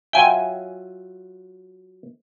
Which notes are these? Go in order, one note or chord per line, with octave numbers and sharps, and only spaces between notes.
F#3 F4 E5 G5 G#5